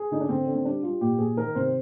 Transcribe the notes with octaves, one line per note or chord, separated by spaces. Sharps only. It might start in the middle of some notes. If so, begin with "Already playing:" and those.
Already playing: G#4
D3 D#4
D4
D3 C4
D3
C4
G3 D4
G3 F4
A#2 G4
A#2 G#4
D#3 A#4
C3 C5